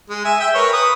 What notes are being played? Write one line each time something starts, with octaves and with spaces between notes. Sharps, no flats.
G#3
E5 G#5
E5 G5
A#4 B4 C#5
B4 D#6